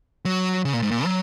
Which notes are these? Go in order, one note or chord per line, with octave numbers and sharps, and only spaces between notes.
F#3
C#3
A#2
G#2
A#2
F#3